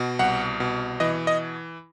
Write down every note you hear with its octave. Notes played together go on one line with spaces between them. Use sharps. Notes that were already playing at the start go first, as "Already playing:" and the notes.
Already playing: B2
C2 F#5
B2
E3 D#5
D#5